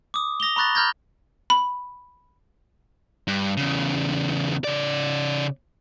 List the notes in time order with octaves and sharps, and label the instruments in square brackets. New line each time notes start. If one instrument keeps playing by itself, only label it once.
[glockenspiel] D6 D#6
D#6 A#6 F7 G7
A#5 B5 C#6 F#6 A6 A#6
A#5 B5 F6 G6 G#6 A#6
[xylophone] B5
[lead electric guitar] G2
E2 C#3
C#3 D5